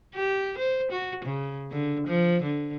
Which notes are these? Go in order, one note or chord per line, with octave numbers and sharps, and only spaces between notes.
G4
C5
F#4
C#3
D3
F3
D3